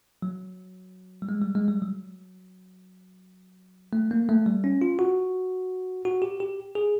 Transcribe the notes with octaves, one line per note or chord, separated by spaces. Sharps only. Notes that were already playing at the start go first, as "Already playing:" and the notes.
F#3
G3
G#3
G3
G#3
G3
F#3
A3
A#3
A3
G3
C#4
F4
F#4
F#4
G4
G4
G#4